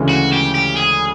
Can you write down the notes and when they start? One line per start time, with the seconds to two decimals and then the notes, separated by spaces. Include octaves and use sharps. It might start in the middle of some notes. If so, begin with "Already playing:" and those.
Already playing: D2 C#3 E3 G#3
0.09 F#4
0.33 G4
0.55 G4
0.77 G#4